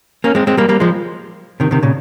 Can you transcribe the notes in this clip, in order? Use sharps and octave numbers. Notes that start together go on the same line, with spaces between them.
A#3 C#4
G#3 C4
G#3 C4
G3 A#3
G3 A#3
F3 G#3
C3 D#3
C3 D#3
A#2 C#3